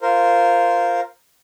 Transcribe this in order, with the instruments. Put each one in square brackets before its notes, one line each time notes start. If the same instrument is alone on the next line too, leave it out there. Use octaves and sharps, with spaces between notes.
[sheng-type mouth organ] F4 A#4 C5